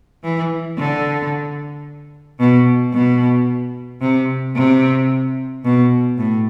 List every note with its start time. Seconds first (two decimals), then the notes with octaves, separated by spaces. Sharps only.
0.24 E3
0.78 D3
2.39 B2
2.93 B2
4.01 C3
4.55 C3
5.64 B2
6.18 A2